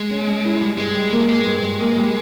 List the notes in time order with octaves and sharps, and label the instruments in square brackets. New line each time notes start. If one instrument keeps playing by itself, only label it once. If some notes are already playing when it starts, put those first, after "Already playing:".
Already playing: [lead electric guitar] G#3
[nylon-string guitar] C#4
C#4
E4
G3
[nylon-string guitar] G2 [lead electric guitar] G#3
[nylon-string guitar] G3
A#3
[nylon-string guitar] G2 [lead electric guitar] G#3
[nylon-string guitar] G2
G2
A#3
G3